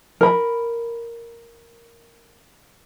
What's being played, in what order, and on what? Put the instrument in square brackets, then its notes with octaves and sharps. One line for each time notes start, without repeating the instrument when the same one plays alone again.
[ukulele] A#4 B5